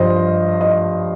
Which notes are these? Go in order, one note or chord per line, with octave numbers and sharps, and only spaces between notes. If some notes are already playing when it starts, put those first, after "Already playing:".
Already playing: G2 F3 C5 D#5
D#5